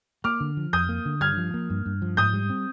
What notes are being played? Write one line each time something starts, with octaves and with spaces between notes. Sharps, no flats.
A#3 D6 F6
D3
F3
F2 D#6 G6
A#3
D3
G2 F6 G#6
F3
A#3
G2
G2
F3
G#2 D#6 G6
G3
C4